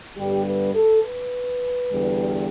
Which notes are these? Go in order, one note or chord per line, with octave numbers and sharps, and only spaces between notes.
G2 D3 G3 B3 G4
B4
A4
B4
E2 D3 G3